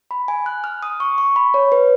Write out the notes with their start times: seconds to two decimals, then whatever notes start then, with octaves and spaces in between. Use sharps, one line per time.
0.11 B5
0.28 G#5
0.46 F#6
0.64 F6
0.83 D#6
1.00 C#6
1.18 C#6
1.36 B5
1.54 C#5
1.72 B4